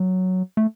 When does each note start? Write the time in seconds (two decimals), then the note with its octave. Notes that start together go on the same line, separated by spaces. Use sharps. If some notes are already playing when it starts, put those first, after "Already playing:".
Already playing: F#3
0.57 A3